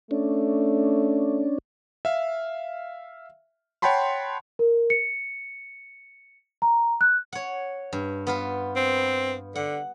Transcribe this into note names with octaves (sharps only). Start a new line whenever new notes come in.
A3 C#4 D4
E5 F5
C#5 F#5 G5 A5 B5 C6
A#4
C#7
A#5
F#6
C#5 F#5
G2
B3 F4 B4
C4
D3 F#5